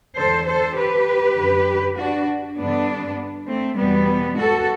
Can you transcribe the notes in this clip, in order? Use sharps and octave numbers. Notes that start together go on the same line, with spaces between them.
E2 D3 A4 C5
A4 C5
G4 B4
F#2 D3
D4 F#4
G2 D3 B3 D4
A3 C4
E2 B2 G3 B3
F#4 A4